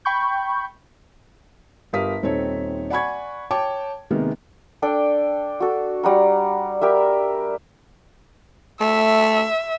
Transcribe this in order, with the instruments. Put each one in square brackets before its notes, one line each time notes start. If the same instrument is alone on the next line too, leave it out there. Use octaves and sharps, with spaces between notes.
[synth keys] G5 B5 C#6 G6
[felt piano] G1 G4 A#4 F5 D#6 B6
D#1 C4 D#4 A4 C#5
D5 F#5 G#5 B5 C#6 G#6
C#5 G5 A5 D6
C3 D#3 G#3 A#3 B3
[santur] D4 A4 G5
F#4 A4
G3 F#5 A#5
G4 A#4 E5
[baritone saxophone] A3 [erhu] E5